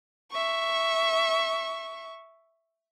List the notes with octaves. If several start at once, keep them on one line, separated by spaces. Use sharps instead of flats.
E5 C#6